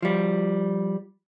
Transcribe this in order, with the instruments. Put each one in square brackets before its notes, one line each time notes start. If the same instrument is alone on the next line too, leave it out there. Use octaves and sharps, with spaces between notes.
[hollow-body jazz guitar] F3 G3